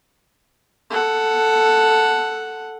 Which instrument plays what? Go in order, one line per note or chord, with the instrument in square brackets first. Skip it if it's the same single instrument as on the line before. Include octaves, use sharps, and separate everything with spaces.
[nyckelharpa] A4 F#5